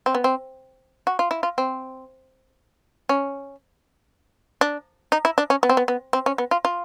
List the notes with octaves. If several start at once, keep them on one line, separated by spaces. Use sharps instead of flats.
C4
B3
C4
F#4
F4
E4
F4
C4
C#4
D4
D#4
E4
D4
C#4
B3
C4
B3
B3
C4
C#4
B3
F4
F4